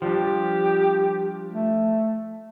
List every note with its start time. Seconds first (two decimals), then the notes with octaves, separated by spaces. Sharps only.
0.02 F3 G3 D4 G4
1.53 A3